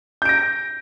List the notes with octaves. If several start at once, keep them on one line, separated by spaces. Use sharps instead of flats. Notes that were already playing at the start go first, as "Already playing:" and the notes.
G6 A#6 D7